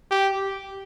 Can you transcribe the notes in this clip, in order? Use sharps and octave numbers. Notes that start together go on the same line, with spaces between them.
G4